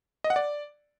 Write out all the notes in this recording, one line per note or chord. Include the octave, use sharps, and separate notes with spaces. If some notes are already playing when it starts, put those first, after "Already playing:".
D#5
F#5
D5